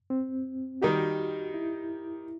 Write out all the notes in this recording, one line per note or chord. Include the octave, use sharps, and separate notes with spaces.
C4
D#3 G3 D#4 F#4 G4
E4